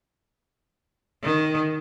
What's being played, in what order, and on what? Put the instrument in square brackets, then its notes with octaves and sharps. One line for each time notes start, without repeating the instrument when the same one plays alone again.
[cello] D#3